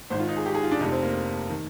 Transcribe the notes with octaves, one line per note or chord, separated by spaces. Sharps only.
G#1 G#2 D#3 C5
F4
D#4
G#4
G4
G#4
F4
D4
F1 F2 C3 D#4
C4
A#3
D#3